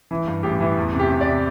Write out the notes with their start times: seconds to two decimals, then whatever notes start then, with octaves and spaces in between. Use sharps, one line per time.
0.11 E3
0.27 G2
0.43 A1 G4
0.60 E3
0.77 E2
0.93 C3
1.00 G4
1.10 C3
1.21 D5
1.26 C3